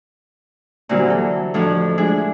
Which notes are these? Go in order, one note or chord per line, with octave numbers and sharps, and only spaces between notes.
A#2 D3 E3 F#3 G3 C4
A4
F2 A2 F3 D4
G#3 D4 E4 G#4